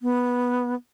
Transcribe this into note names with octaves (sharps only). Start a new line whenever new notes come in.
B3